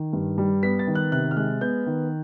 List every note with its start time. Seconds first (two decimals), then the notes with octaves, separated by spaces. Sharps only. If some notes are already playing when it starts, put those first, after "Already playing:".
Already playing: D#3
0.13 G2
0.38 G3
0.63 B3 B6
0.79 A6
0.87 D#3
0.95 F#6
1.12 C3 F#6
1.31 F6
1.37 G#3 F#6
1.61 B3 G6
1.86 D#3